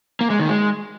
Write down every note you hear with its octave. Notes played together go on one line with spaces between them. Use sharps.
A#3
G#3
D#3
G#3